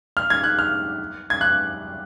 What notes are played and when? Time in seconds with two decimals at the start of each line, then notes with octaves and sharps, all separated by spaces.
0.17 F6
0.30 G#6
0.44 F#6
0.59 F6
1.30 G#6
1.41 F#6